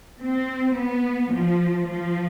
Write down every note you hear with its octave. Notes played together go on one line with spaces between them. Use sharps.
C4
B3
F3
F3